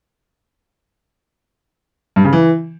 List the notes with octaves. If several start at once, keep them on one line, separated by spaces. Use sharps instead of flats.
G2
C#3
E3